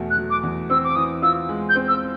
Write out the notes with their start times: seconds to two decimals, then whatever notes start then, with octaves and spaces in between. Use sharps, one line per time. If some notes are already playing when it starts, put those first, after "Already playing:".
Already playing: E2 B2 A3
0.10 F#6
0.17 F#3
0.30 D6
0.43 E2
0.70 C4 E6
0.84 D6
0.96 E3 D#6
1.22 F4 E6
1.49 G#3
1.69 G6
1.76 C4
1.88 E6